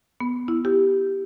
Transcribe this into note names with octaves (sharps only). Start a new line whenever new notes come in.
B3
E4
G4